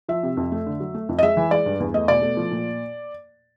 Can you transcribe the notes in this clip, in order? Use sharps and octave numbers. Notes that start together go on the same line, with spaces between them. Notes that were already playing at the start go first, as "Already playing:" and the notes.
F3 E5
C3
F2
A3
D3
F#3
A3
F2
D#5
G#3 E5
E3
G#3 D5
G2
E2
A3 D#5
B2 D5
A3
F3
A#2